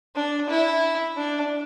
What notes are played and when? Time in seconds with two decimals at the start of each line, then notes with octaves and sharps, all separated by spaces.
0.16 D4
0.49 E4
1.17 D4